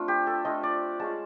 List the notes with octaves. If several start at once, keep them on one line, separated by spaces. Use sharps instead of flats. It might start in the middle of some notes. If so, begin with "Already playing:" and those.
Already playing: A3 C4 D4 F4
G4
A4
A3 D4 F4 D#5
D5
G#3 C#4 F4 A5